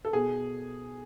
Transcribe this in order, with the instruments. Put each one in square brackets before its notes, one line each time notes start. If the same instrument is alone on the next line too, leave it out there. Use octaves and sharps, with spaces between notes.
[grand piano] A4
B2 G#4